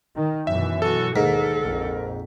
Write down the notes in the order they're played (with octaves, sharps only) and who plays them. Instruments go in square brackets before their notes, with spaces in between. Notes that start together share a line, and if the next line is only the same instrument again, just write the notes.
[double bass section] D#3
[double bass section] F#2 B2 E3 [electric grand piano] E5
[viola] F#4 [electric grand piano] A4
[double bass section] D#2 [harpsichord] G#2 [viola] A4 [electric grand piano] A#4 B6
[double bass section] A#1 F2